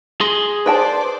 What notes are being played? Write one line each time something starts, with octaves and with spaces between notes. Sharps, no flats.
G#4 C6
B4 C5 D5 G5 A5